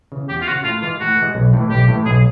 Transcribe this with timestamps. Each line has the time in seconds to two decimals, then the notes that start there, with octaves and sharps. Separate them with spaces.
0.12 C#3 E3
0.29 E2 G4
0.42 F4
0.47 C#3 E3 F#4
0.64 A2 F4
0.82 E3 G#3 F4
1.00 A2 F#4
1.17 E3
1.22 G#3
1.35 B1
1.53 A2 E3
1.70 B1 G4
1.88 A2 E3
2.06 B1 G#4